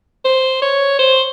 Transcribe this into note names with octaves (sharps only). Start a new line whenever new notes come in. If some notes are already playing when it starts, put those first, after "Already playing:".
C5
C#5
C5